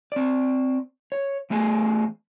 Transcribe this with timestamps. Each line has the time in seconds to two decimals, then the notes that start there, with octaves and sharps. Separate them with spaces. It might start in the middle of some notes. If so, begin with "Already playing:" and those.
0.12 C4 D5
1.12 C#5
1.50 E2 A3 G#4 G#5